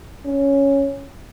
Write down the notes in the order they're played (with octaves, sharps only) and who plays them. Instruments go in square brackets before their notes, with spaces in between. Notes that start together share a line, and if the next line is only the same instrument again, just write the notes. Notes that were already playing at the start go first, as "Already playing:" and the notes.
[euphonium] C#4